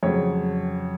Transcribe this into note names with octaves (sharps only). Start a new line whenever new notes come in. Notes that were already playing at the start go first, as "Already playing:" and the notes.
F2 C#3 F#3 C#5